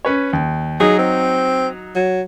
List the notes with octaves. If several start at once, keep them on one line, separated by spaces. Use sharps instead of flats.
C#4 B4 C#5
D#2
F#3 D#4 G#4
C4
F#3